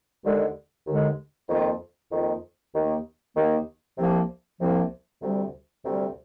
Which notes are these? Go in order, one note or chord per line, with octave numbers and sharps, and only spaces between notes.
D#2 D3 G#3
D#2 D3 G#3
F2 D#3 A#3 F4
F2 D#3 A#3 F4
D#2 D#3 A#3
D#2 D#3 A#3
C2 C3 F3 A#3
C2 C3 F3 A#3
D2 C3 G3
D2 C3 G3